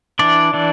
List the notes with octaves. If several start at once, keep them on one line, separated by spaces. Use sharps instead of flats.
E3 D4 D5
E3 D4